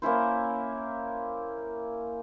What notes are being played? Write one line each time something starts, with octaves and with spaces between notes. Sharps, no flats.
A#3 C#4 E4 C5